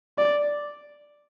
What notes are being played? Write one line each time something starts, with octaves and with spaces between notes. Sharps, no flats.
D5